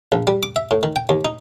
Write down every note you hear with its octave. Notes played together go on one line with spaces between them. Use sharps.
A#1
G3
D6
E5
A2
D#3
G5
D#2
D#4